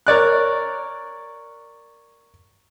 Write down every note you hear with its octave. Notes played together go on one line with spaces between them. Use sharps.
A#4 C#5 D5 F#6